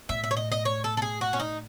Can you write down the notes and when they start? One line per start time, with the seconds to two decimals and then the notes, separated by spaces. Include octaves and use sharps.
0.09 A2 E5
0.24 E5
0.31 C#5
0.37 D#5
0.52 D#5
0.65 C#5
0.84 A4
0.97 A4
1.02 G#4
1.21 F#4
1.33 C#4
1.40 D#4